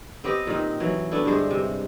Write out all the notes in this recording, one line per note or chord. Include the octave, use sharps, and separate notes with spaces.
B3 C4 G4 D#5
A#2 D#3
E3 F#3
A3 B3 D4 E4
G2 D3 G#3 C5
C3